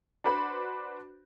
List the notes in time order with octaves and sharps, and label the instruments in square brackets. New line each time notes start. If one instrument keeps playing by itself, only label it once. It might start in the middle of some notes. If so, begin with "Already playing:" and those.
[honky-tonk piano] D4 F#4 B4 C5 B5